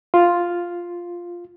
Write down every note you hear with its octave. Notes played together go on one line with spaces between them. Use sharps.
F4